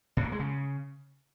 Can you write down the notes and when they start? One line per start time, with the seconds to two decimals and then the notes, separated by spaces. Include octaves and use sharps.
0.17 A2
0.24 A#3
0.32 G#3
0.40 C#3